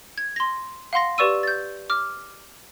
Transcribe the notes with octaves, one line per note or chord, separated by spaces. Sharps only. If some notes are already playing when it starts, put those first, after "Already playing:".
G#6
C6 A#6
F5 F#5 C6 A#6
G4 B4 D5 C#6 E6 D#7
G6 A6
D6 F6